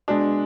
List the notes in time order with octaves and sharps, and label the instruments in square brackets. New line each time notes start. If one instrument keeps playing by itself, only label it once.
[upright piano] B2 G#3 D4